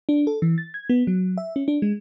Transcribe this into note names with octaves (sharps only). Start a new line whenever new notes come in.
D4
A4
E3
A6
G#6
B3
F#3
E5
C#4
D4
G#3